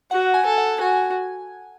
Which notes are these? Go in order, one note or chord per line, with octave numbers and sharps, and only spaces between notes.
F#4 F#5
G#5
A4
F#5
F#4 G#5